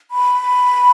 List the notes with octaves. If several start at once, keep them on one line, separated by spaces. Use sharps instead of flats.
B5